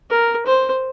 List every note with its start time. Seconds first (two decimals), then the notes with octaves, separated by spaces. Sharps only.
0.10 A#4
0.46 C5